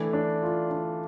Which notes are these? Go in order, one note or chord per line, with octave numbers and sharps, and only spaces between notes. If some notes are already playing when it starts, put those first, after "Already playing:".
Already playing: E3 A3 D4
D4
F4
D4